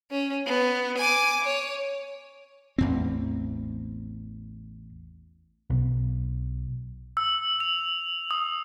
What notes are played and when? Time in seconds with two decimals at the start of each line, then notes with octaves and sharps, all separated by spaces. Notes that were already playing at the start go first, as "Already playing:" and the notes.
0.11 C#4
0.46 B3
0.98 G#5 D6
1.44 C#5
2.78 A1 E2 C4
5.70 B1
7.17 E6
7.60 F7
8.31 D#6